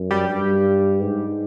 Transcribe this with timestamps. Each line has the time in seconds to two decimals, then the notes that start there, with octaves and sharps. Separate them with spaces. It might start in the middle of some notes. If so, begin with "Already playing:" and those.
Already playing: F#2
0.11 G3 G4
0.29 G2
1.01 G#2